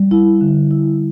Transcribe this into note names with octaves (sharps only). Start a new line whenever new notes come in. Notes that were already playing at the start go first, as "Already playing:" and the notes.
Already playing: G3
E4
D3
E4